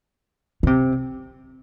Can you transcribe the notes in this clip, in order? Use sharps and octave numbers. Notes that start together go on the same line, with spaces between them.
D3
C3